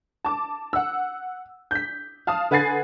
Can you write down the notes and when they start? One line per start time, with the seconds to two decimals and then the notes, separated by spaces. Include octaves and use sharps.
0.25 A5 D6
0.73 F#5 E6
1.71 G6 B6
2.27 F5 A5 D#6
2.51 D3 B4 F#5 G#5 A6 C7